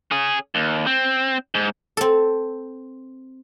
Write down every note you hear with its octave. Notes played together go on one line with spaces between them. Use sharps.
C#4 G#4
D#2
C4
G#2
C4 A4